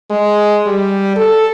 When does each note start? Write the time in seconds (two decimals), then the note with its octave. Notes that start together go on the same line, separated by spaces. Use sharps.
0.10 G#3
0.66 G3
1.16 A4